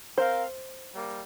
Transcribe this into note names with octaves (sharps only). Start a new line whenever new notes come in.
C4 A#4 C5 F5
G3 A#3